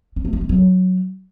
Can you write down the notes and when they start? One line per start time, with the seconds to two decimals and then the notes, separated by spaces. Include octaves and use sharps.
0.16 C#4
0.25 A3
0.33 C#4
0.41 G#3
0.49 F#3